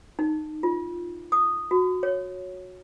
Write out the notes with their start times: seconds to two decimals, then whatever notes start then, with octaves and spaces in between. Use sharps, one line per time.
0.19 D#4
0.63 F4
1.32 D#6
1.71 F#4
2.03 C#5